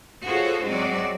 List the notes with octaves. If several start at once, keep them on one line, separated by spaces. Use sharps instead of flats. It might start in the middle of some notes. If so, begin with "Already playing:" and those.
F4 F#4 G#4 A4 C5 C#5
F#3 G#3 C4 F#4 D5